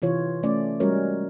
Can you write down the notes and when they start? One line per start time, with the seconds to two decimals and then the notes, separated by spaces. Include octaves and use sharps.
0.02 C3 E3 F4 C#5
0.43 A3 C#4 D5
0.80 G3 G#3 C#4 F#4 A#4 C#5